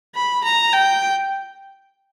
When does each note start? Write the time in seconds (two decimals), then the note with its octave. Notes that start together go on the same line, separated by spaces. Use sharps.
0.15 B5
0.44 A#5
0.73 G5